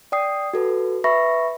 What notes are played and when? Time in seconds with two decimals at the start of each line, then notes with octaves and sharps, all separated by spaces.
0.12 D5 G5 D#6 C7
0.53 F#4 A4 B4
1.04 B4 E5 B5 C#6 A#6